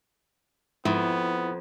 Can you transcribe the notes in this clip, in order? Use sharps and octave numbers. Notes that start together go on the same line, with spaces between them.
F2 G#2 B3 E4